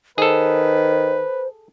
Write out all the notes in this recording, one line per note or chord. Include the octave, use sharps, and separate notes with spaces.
D#3 G#4 A4 B4 C5